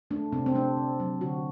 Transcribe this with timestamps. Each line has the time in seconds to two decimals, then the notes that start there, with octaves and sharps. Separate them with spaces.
0.11 A3 D4
0.33 C3 C4
0.46 C4
0.55 A3 D4
0.77 C3
1.00 F#3
1.21 D3 F#4